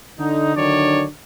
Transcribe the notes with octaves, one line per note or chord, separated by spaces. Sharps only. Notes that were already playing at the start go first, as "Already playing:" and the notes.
D3 D#4
D3 D#3 F#3 D4 C#5 D5